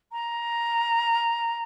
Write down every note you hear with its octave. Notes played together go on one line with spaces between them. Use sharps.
A#5